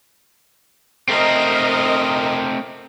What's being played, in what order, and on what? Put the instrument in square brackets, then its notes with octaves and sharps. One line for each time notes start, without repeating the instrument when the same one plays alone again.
[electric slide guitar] A3 C4 [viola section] A#4 D#5